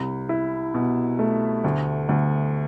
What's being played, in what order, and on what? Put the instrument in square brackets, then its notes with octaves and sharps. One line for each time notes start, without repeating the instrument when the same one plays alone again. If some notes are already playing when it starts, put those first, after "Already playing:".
Already playing: [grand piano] C2
E4
B2
A3
D2
D2